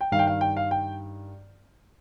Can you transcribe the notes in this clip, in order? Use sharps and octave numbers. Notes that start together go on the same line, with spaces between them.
G5
G2 D#3 F5
G5
F5
G5
F5
G5